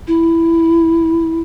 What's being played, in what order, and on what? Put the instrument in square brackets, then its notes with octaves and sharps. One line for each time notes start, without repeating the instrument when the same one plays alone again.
[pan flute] E4